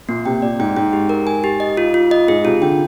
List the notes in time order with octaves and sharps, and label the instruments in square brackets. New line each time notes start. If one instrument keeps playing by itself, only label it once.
[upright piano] A#2 [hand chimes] A#3
[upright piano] C3 [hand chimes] G5
[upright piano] A#2 [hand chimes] D5
[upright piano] G#2 [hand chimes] G5
[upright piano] G#2 [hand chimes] G5
[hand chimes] G4
A#4
G#5
G4
D#5
F4
F4
D#5
[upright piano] G#2 [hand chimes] G#4
[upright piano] C3 [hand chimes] F4
[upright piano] D3 [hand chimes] G5